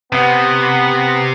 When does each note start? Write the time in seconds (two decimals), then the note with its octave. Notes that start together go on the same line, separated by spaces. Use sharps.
0.12 C3 B3